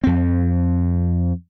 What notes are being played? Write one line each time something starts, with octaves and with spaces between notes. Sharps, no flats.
F2 C4